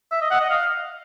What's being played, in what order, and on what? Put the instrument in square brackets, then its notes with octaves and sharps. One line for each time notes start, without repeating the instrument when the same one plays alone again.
[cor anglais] E5
D#5
F#5
D#5
F5